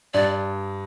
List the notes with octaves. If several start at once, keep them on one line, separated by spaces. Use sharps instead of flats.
G2 D5